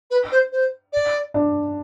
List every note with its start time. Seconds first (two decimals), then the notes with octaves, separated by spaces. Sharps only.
0.10 B4
0.31 C5
0.52 C5
0.92 D5
1.34 D4